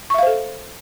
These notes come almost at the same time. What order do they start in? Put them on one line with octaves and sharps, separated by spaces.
C#6 E5 F5 C5 A4